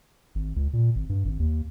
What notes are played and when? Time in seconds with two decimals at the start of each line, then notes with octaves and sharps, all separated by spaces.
0.35 G#1
0.56 C#2
0.73 A#2
0.95 G#1
1.09 G2
1.25 G#1
1.40 D#2